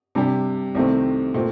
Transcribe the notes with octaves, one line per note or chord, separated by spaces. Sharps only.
C3 G3 D4 G4
C2 C3 D#3 A3 C4
A#2 A3 C4